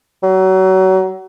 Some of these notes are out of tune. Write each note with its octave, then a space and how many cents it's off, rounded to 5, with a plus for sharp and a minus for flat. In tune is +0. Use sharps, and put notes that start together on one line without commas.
F#3 +30